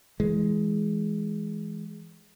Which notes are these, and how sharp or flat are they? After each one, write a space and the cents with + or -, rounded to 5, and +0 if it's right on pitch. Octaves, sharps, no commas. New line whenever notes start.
E3 +0 G#3 +10